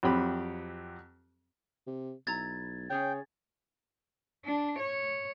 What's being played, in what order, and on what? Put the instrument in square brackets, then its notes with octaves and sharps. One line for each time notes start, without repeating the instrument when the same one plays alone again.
[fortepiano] F2 F#3 C4 G4 B5
[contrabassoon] C3
[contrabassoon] B1 [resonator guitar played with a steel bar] E4 A#5 [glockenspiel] G#6 A6
[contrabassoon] C#3 [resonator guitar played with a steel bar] C#4 G#4 C#5 [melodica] G5
[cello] D4
C#5